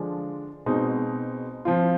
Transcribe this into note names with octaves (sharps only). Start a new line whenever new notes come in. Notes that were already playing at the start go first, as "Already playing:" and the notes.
Already playing: D3 F3 G#3 D4 F4
B2 G#3 C4 D#4
F3 C4 F4